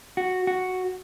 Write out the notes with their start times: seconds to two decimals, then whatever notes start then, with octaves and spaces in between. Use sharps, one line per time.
0.17 F#4
0.47 F#4